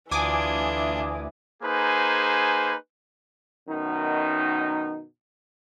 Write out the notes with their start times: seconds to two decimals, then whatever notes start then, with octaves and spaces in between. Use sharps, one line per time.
0.11 D2 E3 D4 F4 G#5 D6 D#6
1.63 A#3 D#4 G#4 B4 C5 G#5
3.68 F#2 B2 D#3 D#4